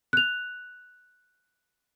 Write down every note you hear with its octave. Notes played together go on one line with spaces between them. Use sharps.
F#6 F7